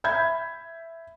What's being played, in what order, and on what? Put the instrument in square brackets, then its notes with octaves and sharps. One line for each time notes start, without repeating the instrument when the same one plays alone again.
[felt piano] E5 B5 G6 G#6